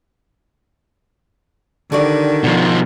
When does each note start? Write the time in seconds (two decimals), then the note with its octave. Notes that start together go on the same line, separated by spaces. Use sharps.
1.92 D3 D#3 G3 F#4 D5
2.44 B2 F3